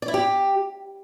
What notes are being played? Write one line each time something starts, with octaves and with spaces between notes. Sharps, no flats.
D5
E4
G4